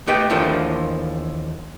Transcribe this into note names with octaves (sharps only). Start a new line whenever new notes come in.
A3 G4 B4 D#5 G5
D#2 E3 F3 A3 A#3 D4